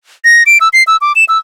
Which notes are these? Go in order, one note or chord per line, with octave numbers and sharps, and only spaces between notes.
A#6
D7
E6
C7
E6
D6
E7
E6